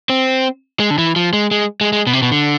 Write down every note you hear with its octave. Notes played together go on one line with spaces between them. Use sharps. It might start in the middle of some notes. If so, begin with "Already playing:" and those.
C4
G#3
D3
E3
F3
G#3
G#3
G#3
G#3
B2
C3
B2
D3